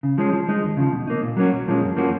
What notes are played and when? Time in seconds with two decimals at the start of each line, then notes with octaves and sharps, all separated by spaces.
0.03 C#3
0.18 F3 G#3 C#4
0.33 F3
0.48 G#3 D#4
0.63 D#2
0.77 C#3 F3
0.93 B2
1.07 A#3 D#4
1.22 A#2
1.37 F#3 A#3 C#4 F#4
1.53 B1
1.67 A#2 F3 G#3 C#4
1.82 F#2
1.97 F3 A#3 C#4 F#4